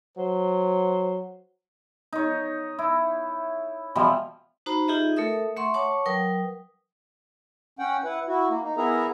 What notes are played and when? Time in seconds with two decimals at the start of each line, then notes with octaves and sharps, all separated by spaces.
0.18 F#3 C5
2.13 D#4 C#5
2.79 E4
3.95 B2 E3 F3 G3
4.66 D#4 F#4 C5 A#5 B5
4.88 D#4 F4 G4 G#4 D#5 E5
5.16 A3 A4 A#4 E5 D#6
5.56 A3 E5 F#5 C6 C#6
5.74 C#5 F#5 A5 C#6 D6
6.06 F#3 A#4 B4 G5 D#6
7.79 C#4 F#5 G5
8.04 E4 B4 F#5
8.28 E4 F#4
8.50 A#3
8.63 D#4
8.77 B3 E4 G#4 A#4 E5 A#5